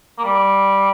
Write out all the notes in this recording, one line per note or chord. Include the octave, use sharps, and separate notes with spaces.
A#3
G3